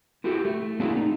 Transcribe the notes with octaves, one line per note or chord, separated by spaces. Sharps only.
E4 F#4 G4 A4
A3
A#3 C4 D4 E4 F#4 G#4
D#4